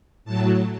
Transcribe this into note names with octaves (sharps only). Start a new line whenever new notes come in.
A2 F#3 A5